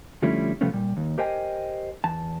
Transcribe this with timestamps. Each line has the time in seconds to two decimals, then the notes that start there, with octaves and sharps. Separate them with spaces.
0.22 D3 F3 G3 A3 C#4 E4
0.61 C3 F3 G3 A3 B3 C#4
0.73 A#2 G3
0.97 D#2
1.18 G4 A#4 C5 D#5 G5 G#5
2.04 E2 A5